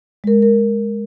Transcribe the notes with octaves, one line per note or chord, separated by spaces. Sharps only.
G#3 A#4
A#4